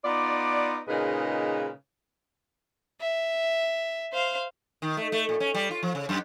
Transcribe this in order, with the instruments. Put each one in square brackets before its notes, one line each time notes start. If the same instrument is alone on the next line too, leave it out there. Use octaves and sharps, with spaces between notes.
[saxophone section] B3 D#4 F4 D5
A#2 C#3 G#3 D#4 A#4 B4
[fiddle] E5
C5 F5
[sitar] D#3
A3
A3
A#2
C#4
G3
F4
F3
C#3
F#2